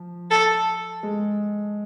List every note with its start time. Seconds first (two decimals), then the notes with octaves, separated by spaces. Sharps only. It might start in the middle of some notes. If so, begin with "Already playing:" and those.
Already playing: F3
0.31 A4
1.03 G#3